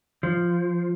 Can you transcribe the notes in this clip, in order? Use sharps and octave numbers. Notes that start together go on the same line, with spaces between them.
F3